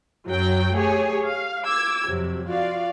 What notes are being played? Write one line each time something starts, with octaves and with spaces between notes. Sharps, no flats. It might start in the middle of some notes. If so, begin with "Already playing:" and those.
F#2 F#3 F#4 G5
A3 G4 G#4 C#5 G#5
F5
D6 E6 G#6
F2 C3 F#3
F4 F#4 D5 F5